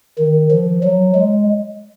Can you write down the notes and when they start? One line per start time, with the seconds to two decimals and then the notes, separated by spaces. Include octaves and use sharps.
0.18 D#3
0.51 F3
0.83 F#3
1.15 G#3